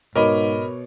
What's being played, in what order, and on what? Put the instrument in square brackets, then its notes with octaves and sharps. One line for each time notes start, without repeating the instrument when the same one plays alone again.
[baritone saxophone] G#2 [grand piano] B2 C#5 D6 [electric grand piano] A#4 D#5 B5